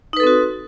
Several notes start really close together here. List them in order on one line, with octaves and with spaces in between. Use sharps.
D#4 B4 A4 C4 F#4